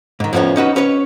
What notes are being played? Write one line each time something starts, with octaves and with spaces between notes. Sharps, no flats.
G#2 D#3
F2 A2 F3 G#3 B3 C#4
C#4 D#4 F#4 B4
C#4 B4 C#5